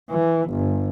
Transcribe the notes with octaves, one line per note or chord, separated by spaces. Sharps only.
E3
G1